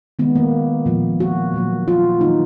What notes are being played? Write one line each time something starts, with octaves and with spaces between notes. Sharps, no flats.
D#3 G#3 B3
A#3
A#2 F3 A#3
F#4
A#2 F#3 A#3
F4
D#3 F#3 A#3 D#4